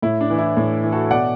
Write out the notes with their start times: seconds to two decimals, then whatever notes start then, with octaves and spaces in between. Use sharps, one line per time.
0.02 A2 E4
0.21 D4
0.30 E3
0.39 E4
0.57 A2
0.84 E3
0.92 F#4 A4
1.10 B2 D5 F#5